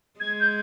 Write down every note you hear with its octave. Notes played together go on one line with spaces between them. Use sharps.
G#3 G#6
G6